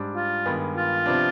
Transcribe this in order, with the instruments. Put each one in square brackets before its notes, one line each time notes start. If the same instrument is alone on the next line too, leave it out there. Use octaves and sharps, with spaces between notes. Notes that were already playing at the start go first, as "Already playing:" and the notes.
Already playing: [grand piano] G#2 G3 D4
[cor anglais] F4
[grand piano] G2 D#3 G#3 B3
[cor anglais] F4
[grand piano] C3 F3 B3 D4